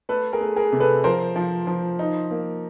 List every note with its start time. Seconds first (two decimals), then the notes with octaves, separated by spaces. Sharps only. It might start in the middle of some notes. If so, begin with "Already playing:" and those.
0.09 A3 A4 B4
0.33 G#4 A#4
0.41 A3
0.56 G#4 A#4
0.72 C3
0.80 A4 B4
1.04 F3 A#4 C5
1.36 F3
1.67 F3
1.99 D#4
2.31 A#3